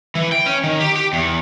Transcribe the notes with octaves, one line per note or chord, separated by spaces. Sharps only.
E3
G5
C#4
D#3
G4
G4
E2